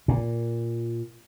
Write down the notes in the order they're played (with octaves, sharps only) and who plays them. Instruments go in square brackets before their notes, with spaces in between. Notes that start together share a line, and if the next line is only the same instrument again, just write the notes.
[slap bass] A#2